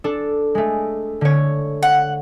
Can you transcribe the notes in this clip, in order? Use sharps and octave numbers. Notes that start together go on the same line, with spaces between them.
D4 A4
G#3 A3
D3 C#5
F#5